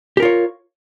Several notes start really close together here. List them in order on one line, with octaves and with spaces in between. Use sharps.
G4 A#4 F4 C#5